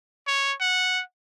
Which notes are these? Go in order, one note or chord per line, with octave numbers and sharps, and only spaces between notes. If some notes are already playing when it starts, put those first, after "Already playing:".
C#5
F#5